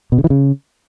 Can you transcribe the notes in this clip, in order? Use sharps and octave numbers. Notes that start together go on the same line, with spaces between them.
B2
C#3
E3
C#3